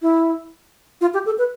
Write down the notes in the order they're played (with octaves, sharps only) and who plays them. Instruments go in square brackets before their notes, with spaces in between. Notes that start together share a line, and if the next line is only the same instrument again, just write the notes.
[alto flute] E4
F4
G4
A4
B4